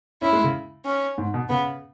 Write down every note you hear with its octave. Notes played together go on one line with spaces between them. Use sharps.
C#4 E4
G#3
C#3
C#4
G#2
B2
C#3 B3